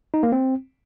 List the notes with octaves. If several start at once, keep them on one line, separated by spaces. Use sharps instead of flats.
D#4
A#3
C4